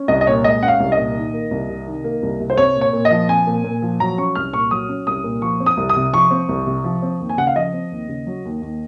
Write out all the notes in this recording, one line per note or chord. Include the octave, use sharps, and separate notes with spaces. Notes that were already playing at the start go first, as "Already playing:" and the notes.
Already playing: C#4
C2 D#5
D#5
A#2 C#5
G#3 D#5
C#4 F#5
F5
C2
D#5
A#2
D#3
A#3
C2
C3
D#3
A#3
C2
C3
C5
C4 C#5
A#2
C#5
A#2
D#5
F3
C4 G#5
A#2
A#2
F3
F#3 A#5
C#4 C#6
C2 F6
A#2 C#6
F#3 D#6
C#4
C2 D#6
A#2
F3 C#6
C4
D#6
C2
D#6
C3
F3 C#6
C4
C2
C3
F3
C4
D#2
G#5
C#3 F#5
F5
F3 D#5
C4
D#2
C#3
F#3
D#2
D#2